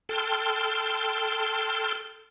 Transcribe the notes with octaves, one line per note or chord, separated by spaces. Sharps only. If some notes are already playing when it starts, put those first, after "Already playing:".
A4 G5 A5 C6 F6